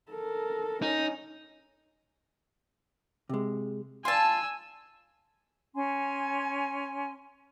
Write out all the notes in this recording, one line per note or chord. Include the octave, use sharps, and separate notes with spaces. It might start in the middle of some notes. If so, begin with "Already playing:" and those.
A4 A#4
C#4 D#4
C3 G#3
F4 D5 G#5 A5 C6 E6
C#4 G#5 C6